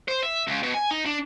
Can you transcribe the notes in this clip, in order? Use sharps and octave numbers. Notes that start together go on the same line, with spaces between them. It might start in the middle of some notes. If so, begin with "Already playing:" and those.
C5
E5
C#2
B2
G#5
D#4
D4